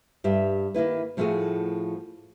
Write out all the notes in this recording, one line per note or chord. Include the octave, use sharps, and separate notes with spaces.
G2 G4 E5
D#3 A#3 E4 B4
A2 F3 A3 F4 F#4 G#4